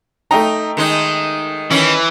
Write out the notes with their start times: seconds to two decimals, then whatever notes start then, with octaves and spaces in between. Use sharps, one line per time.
0.31 A3 D#4 G5 A#5
0.77 D#3 G#3 D#4
1.71 D#3 E3 C#4